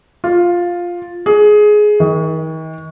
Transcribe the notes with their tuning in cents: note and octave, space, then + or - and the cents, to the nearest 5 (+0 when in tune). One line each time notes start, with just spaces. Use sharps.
F4 +5
G#4 +15
D#3 +40